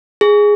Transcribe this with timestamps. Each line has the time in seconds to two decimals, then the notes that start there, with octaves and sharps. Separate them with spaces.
0.21 G#4